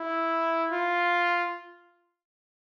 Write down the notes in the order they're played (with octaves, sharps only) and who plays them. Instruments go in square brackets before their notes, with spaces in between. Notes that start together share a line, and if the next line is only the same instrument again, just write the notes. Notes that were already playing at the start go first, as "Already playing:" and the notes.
Already playing: [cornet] E4
F4